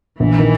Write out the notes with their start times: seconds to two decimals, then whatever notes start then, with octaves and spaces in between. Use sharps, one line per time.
0.20 A#1 E3
0.39 D#3